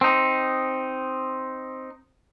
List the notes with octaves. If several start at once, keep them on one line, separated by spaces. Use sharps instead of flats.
C4 D#4